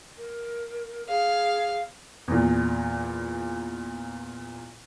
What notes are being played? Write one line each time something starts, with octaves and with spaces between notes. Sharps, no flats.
A#4
G#4 F5
E2 A#2